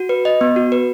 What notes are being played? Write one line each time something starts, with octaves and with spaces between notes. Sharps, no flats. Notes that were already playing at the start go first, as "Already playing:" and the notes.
Already playing: F#4
B4
D#5
B3
F#4
B4